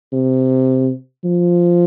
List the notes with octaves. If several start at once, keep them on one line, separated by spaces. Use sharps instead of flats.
C3
F3